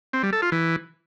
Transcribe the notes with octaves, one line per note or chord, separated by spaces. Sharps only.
C4
G3
A4
F4
E3